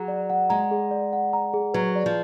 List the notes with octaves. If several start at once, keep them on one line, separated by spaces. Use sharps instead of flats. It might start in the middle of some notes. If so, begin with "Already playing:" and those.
Already playing: F#3 G#4 F#5 A#5
D5
F#5
G#3 A#5
G#4
D5
F#5
A#5
G#4
F#3 B4
D5
F3